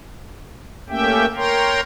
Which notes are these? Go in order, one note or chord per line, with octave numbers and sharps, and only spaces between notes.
A3 A#3 C#4 G4 E5 G5
A#4 C#5 G5 A#5 C6